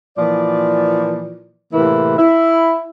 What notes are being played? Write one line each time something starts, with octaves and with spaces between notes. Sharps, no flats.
A#2 E3 F3 D5
A2 C3 E3 A#3 E4 B4
E4 E5